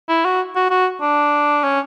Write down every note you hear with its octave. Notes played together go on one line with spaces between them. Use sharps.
E4
F#4
F#4
F#4
D4
C#4